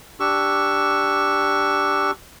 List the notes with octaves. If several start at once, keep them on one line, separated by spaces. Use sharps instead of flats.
D4 G4 C#6 E6